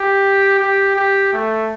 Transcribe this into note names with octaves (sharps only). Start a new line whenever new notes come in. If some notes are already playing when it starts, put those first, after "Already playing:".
Already playing: G4
G4
G4
A3